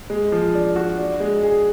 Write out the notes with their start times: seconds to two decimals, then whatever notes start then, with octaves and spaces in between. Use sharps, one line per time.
0.10 G#3
0.32 F3
0.55 D4
0.76 F#4
0.98 D4
1.20 G#3
1.43 G#4